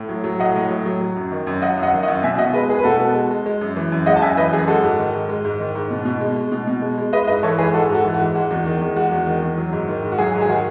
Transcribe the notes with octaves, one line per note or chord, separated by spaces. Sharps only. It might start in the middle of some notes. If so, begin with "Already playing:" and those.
Already playing: A2
F#3
F#3
A2 D#5 F#5
A2
F#3
F#3
F#3
F#2
D#3
F#2
F#3 D#5 F#5
F#2
D#5 F#5
D#3
D#5 F#5
F#2
B2 E5 G#5
B2 D#5 F#5
G#3 B4 D#5
G#3 G#4 B4
B4
B2 F#4 A4
B2
G#3
G#3
G#3
F#2
E3
F#2
G#3 D#5 F#5
A5
F#2 E5 G#5
E3 B4 D#5
F#2 G#4
G#3 F#4 A4
G#2
D#3
G#2
G#3
G#2
D#3
G#2
B2
B2
G#3
G#3
B2
B2
G#3
G#3
G#3 B4 D#5
G#2 B4 D#5
E3 A4 C#5
G#2 G#4 B4
G#3 F#4 A4
G#2
F#4 A4
E3
F#4
G#2
G#3 F#4
E2
D#3
E2
G#3 F#4
E2
D#3
E2
F#3
G#2
D#3
G#2
F#4
F#3 G#4
G#2
G#4
D#3 F#4